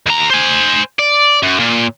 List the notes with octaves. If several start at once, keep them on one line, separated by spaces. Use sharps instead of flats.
D#2 A#5
C5 G#5
D5
F#2
A#2